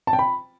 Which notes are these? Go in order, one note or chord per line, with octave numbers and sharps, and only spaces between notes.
A5
G5
B5